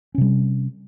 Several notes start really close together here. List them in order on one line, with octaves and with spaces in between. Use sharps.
C#4 C3 G3